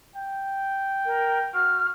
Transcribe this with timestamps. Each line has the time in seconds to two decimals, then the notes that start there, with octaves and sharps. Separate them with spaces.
0.16 G5
1.06 A#4
1.54 F#4 F6